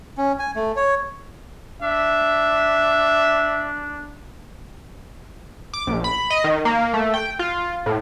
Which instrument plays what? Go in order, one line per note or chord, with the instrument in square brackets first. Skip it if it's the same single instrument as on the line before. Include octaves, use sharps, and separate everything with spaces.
[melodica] C#4
G#5
A3
C#5
[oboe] D4 [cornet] E5
[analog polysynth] D6
A#1
B5
D#5
D#3
A#3
A3
G5
F4
A2